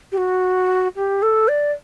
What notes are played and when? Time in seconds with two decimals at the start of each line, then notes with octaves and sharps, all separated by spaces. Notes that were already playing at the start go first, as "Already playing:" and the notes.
0.12 G4
0.17 F#4
0.96 G4
1.22 A4
1.48 D5